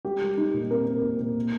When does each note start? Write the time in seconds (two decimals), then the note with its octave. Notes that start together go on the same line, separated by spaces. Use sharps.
0.05 G3 G4
0.22 G3
0.37 G3 D#4
0.54 A#2
0.71 C4 A#4
0.87 C4
1.03 A#2
1.20 A#2
1.36 A#3